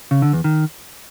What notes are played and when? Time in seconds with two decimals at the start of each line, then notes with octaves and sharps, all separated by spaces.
0.11 C#3
0.22 D3
0.33 E2
0.44 D#3